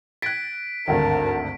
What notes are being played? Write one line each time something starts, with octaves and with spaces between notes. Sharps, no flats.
F#6 G#6 A6 B6 D7
G#1 D2 G2 A#4 A5